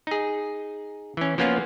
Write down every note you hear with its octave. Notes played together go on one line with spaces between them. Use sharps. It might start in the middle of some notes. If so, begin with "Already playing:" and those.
D#4 G#4
E3 C#4
F3 A#3 B3 C#4 F4